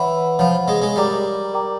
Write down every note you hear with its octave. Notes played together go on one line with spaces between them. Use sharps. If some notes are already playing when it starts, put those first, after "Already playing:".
Already playing: E3 C#5 F#5 B5
F3 C#5 F#5 B5
G#3
G#3
G3 A#4 D5 G5 A#5 D6
A#4 D5 G5 A#5 D6